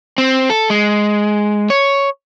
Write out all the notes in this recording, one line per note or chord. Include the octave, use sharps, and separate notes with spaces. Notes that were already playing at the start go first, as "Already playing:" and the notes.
C4
A4
G#3
C#5